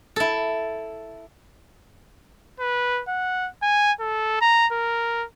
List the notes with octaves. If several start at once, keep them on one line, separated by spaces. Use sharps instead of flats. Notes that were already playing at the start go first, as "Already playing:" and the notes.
E4 A4
B4
F#5
G#5
A4
A#5
A#4